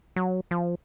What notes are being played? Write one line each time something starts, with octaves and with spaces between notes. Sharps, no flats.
F#3
F3